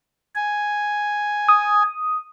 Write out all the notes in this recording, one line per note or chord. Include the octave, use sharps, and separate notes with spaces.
G#5
D#6